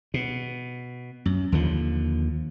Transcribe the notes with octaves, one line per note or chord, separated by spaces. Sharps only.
B2
F#2
D#2 D3 F3